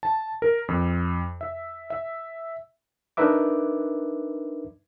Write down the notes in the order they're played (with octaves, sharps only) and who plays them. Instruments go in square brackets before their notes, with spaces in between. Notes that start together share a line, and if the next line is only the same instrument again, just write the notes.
[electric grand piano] A5
A#4
F2
E5
E5
[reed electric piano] D4 D#4 A#4 B4 E5 D6